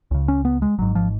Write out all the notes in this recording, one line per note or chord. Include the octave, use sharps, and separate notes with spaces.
C#2 C#3
C#4
B3
G#3
G#1 G#2 F#3
F3